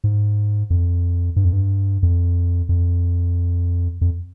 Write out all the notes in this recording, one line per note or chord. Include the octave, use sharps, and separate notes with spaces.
G#2
F2
G2
F2
G2
F2
F2
F2